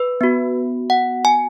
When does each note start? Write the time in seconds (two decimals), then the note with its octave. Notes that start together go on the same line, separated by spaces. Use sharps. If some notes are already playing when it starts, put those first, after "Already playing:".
Already playing: B4
0.21 B3 F#4
0.90 F#5
1.25 G#5